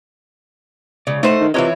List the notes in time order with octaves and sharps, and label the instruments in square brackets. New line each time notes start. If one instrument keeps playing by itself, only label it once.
[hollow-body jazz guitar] C#2 D5 [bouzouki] C#3
[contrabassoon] A2 [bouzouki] A3 C5 F#5 [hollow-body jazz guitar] D#4
[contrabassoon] D#3
[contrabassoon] C3 [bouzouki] E3 E4 C#5 [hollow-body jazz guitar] F4 B4 D#5